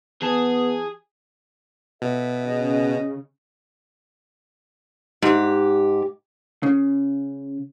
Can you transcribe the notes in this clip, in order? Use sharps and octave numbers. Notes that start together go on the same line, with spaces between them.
E3 B3 G#4 A5
B2 F#4 A4 E5
C#3 D#5
G#2 G4
C#3